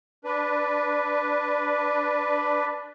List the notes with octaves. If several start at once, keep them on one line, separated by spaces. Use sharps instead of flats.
D4 B4